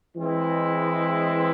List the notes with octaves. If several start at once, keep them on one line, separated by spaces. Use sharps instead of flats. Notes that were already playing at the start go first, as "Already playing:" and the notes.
E3 G#3 C4 E4